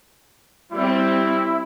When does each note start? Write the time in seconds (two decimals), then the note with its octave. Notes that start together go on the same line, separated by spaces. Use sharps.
0.72 G3 C4 E4